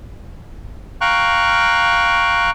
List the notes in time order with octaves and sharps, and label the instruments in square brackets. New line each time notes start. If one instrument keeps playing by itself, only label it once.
[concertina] F5 G5 A#5 C#6 F#6